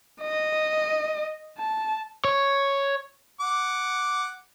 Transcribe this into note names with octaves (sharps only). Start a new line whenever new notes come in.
D#5
A5
C#5
F#5 D6